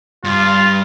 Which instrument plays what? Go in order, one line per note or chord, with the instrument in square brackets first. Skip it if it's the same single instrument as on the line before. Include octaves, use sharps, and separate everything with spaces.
[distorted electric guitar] G2 [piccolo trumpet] F4